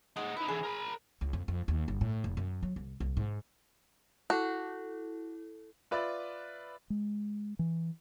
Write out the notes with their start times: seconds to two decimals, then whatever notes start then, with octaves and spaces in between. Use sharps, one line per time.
0.16 G#3 D#4 F#5
0.37 D#4 E4 B4
0.48 D3 E3 G#4
0.64 A#4 B5
1.21 C#2
1.33 F2
1.48 F2
1.68 D#2
1.88 G1
2.01 A2
2.24 F1
2.37 F#2
2.63 F#3
2.76 C2
3.00 C2
3.17 G#2
4.30 E4 F#4 A4
5.91 F4 B4 D5 E5
6.90 G#3
7.59 E3